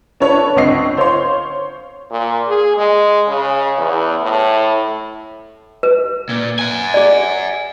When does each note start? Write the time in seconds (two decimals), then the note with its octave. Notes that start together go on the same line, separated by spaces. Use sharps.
0.20 C#4 D4 A4 B4 C#5
0.56 C#2 D3 C4 D#5 C#6 C7
0.97 C5 C#5 F5 C6
2.11 A#2
2.48 G#4
2.77 G#3
3.28 C#3
3.78 E2
4.22 A2
5.83 B4
6.29 A#2
6.59 F#5 G#5
6.94 G#4 D5